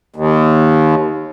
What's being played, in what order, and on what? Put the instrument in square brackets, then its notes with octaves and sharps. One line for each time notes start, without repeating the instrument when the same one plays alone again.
[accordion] D#2